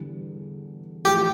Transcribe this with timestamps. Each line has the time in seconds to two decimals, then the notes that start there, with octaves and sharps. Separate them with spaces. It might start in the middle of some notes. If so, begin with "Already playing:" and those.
Already playing: E2 D3 G3
1.04 A1 A2 F3 G4